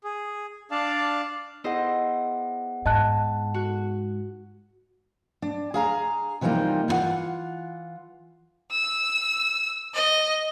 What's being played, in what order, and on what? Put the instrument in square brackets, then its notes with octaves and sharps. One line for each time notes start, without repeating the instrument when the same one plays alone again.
[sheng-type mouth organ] G#4
D4 D5 F5 A5
[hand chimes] B3 G#4 F#5 [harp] E4 C5 D#5
[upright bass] G#2 [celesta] D#5 A5 F#6
[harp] F#4
[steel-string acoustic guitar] D4
G#4 F5 A#5
C3 E3 F3 G3 A#3 D#4
E3 E4 F4 F#5
[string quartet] E6
D#5